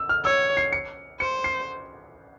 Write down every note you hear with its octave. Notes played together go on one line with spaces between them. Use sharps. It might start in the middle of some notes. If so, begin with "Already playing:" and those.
Already playing: E6
F6
C#5 E6
C7
C#7
C5 C#7
C7